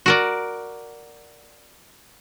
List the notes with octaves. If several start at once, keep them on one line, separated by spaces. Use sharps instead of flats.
F#4 A#4 D5